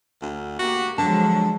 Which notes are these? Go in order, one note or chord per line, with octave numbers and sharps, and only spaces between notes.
D2
A#3 F#4 G4
D3 F3 F#3 G#3 A5